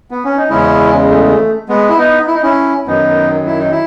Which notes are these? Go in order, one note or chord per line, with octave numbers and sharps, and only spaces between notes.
B3
C#4
D#4
E2 C#3 G#3 C#4 E4
A3
G#3 B3
E4
B3 D#4
E4
D#4
C#4 E4
F#2 D#3 F#3 B3 D#4
E4
D#4
E4